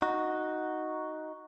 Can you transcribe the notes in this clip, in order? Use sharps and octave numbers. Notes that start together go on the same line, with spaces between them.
D#4 F#4